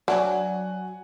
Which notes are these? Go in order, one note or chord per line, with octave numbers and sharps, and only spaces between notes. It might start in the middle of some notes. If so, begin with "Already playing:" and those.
F#3 D4 F#5 G#5